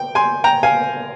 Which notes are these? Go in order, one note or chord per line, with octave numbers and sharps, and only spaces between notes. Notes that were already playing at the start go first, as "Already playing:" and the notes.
Already playing: G5
G#5 C6
G5 A#5
F5 G#5